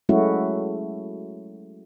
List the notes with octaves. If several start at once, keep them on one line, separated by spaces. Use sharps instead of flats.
F#3 G#3 A3 C#4 E4 F#4